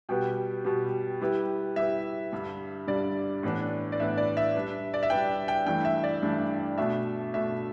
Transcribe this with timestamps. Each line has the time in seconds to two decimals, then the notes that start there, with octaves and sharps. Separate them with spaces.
0.09 B2 G3 B3 G4 B4 G5
0.64 B2 G3 B3 G4 B4
1.21 G3 E4 G4 B4
1.76 G3 E4 G4 B4 E5
2.32 G2 D3 G3
2.87 G2 D3 G3 D5
3.43 A2 E3 B3 D4 B4
3.92 D5
4.00 A2 E3 B3 D4 B4 E5
4.18 D5
4.37 E5
4.55 G3 D4 B4
4.94 D5
5.03 E5
5.10 G3 D4 B4 G5
5.48 G5
5.66 G2 E3 A3 D4 G5
5.85 E5
6.04 D5
6.22 G2 E3 A3 D4
6.78 B2 A3 D4 E5
7.33 B2 A3 D4 E5